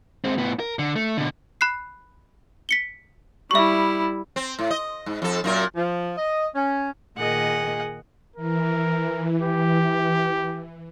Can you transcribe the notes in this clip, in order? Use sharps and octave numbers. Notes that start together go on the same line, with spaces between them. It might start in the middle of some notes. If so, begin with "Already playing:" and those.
G#3 C4
A2 B3
A#4
D3
A3
B2 D3
B5 F#6 C7
B6 C#7 G7
G3 E4 E5 C#6
C4
A2
D#5
G#2
F2 A4
F#2 A#2 A#4
F3
D#5
C#4
A#2 D#3 G#4 D#5 F#5
E3 A#4
G4